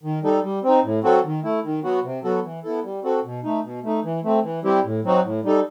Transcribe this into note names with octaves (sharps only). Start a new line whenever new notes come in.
D#3
G3 D#4 A4
G3
C4 D#4
A2
F#3 C4 F#4 A4
D#3
A3 E4
D#3
F#3 B3 F#4
C3
F#3 B3 F#4 A4
E3
B3 E4 A4
G3
C4 F#4 A4
B2
A3 D#4
B2
A3 D#4
E3
A3 C4
E3
G3 C4 E4 G4
A2
F#3 C4 D#4 F#4
A2
G3 D#4 A4